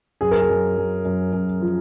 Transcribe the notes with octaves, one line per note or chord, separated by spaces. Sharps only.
F#2 G#4
A#4
G#4
F#2
F#2
F#2
F#2
F3